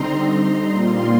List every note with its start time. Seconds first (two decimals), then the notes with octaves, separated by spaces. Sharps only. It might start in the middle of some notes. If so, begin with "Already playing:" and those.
Already playing: D3 G3 C4 D#4 A#5 C6
0.69 A#2 G3 A#3 F4 C6